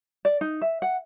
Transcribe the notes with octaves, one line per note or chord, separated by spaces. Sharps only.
D5
D#4
E5
F#5